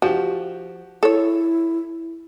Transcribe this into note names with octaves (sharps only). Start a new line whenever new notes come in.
F3 F#4 G4
E4 A4 C#5